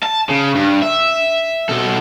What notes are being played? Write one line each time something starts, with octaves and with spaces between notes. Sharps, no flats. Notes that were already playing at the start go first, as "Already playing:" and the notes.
A5
C#3
G2
E5
B2 A4